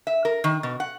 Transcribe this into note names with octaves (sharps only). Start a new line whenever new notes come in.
E5
A#4
D#3
B2
F#5